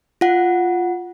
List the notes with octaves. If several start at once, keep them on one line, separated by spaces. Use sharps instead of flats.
F4 F#5